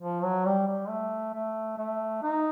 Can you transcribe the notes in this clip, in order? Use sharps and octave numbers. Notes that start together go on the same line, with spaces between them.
F3
F#3
G3
G3
A3
A3
A3
D#4